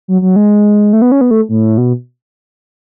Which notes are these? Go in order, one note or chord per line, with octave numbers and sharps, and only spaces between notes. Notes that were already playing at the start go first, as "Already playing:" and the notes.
F#3
F#3
G#3
A3
B3
C#4
B3
A3
A2
B2